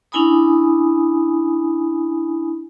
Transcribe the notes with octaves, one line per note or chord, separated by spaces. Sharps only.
C#4 D4 E4 G#5 B5 D#6